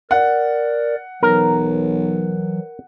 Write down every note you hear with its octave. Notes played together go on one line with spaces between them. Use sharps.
A#4 D5 F#5
B1 E3 F#3 A#4